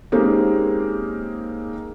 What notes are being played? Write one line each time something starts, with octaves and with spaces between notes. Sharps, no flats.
G#3 A#3 C4 C#4 D#4 G4